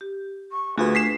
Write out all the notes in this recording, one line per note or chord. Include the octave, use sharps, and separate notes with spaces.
G4
C#6
D2 A3 F4 F#4 G#4 B4
D4 B6 C7 E7